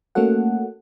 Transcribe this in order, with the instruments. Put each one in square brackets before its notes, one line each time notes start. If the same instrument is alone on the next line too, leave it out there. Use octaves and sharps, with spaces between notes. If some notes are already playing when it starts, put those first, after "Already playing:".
[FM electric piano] A3 A#3 C#4 F#4 A4 F#5